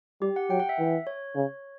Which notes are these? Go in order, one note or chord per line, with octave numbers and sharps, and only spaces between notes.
G3 G4
F#5
F#3 G5
F#5
E5
E3
C#5
C#3